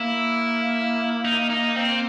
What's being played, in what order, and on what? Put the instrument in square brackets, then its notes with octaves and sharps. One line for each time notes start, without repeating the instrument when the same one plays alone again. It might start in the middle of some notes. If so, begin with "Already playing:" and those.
Already playing: [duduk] A#3 [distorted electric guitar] E4
[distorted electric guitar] D#4
D#4
C4